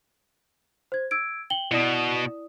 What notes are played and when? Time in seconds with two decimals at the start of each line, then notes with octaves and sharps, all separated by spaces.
0.92 C5 G#6
1.11 E6 G#6 D7
1.50 G5 F#7 G7
1.72 B2 E4 D5 D#6